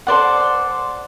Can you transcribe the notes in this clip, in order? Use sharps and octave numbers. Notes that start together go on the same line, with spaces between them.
A4 C5 D5 F#5